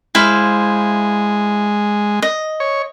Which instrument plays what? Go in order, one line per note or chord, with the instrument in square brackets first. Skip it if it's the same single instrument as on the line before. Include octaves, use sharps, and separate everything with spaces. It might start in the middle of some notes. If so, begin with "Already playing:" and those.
[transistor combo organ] G#3 [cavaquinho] E4 C5 F5
[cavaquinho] D#5
[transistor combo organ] C#5